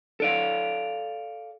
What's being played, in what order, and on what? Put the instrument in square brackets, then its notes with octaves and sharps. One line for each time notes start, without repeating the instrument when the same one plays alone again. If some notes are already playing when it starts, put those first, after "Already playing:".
[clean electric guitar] A4 D5 F5